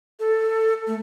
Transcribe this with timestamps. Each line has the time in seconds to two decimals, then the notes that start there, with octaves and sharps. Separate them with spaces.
0.20 A4
0.87 A3